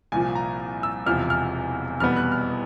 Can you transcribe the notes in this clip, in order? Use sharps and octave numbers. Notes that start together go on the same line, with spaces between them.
C2 A#2 F3 G#5
A#5
E6
E1 E2 C3 F3 F6
F6
F1 E2 B2 G3 B3 F6
F#6
F6